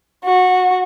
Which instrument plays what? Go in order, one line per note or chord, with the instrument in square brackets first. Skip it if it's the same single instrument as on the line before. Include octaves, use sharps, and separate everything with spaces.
[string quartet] F#4